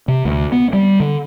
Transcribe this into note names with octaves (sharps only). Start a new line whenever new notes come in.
C3
D2
B3
G3
D3